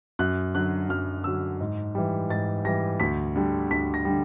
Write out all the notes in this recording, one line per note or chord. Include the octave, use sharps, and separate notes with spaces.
F#2 F#6
D3 F#3 F#6
F#2 F6
D3 F#3 E6
G#2
E3 G3
G#2 A6
E3 G3 A#6
D2 B6
D3 G3
D2 B6
A#6
D3 G3